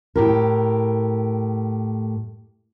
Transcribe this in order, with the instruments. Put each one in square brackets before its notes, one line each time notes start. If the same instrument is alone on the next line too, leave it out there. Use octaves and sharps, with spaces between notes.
[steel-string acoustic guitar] A2 G4 A#4